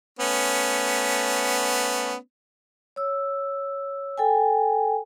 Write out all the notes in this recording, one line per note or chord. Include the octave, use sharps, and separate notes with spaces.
A3 B3 C#4
C#5 E6
A4 G5 G#5